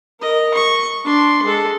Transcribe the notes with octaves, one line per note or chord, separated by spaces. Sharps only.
A#4 D#5
C#6
D4 C6
G#3 A4